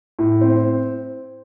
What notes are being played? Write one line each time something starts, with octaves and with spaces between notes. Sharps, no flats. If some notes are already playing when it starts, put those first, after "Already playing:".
A2
C4